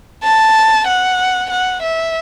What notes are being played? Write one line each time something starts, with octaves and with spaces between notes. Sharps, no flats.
A5
F#5
F#5
E5